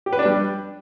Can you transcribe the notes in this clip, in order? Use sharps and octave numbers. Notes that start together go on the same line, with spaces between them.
G4
B4
D4
G3